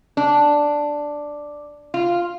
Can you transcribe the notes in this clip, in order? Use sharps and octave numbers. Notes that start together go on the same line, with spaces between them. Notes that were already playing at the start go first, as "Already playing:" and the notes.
D4
F4